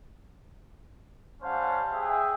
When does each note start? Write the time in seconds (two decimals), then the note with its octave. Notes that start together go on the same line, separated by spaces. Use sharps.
1.43 G3 C#4 C5 F5 F#5 A5
1.94 G#4 E5 G5